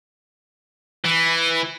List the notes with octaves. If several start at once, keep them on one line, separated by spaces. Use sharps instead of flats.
E3